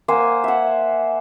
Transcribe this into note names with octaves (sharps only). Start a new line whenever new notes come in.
A#3 C5 F#5 G#5
E5 F#5